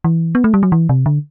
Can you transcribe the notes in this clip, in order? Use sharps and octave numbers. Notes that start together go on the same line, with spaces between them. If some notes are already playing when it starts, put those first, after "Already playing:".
E3
B3
A3
G3
F#3
E3
C3
D3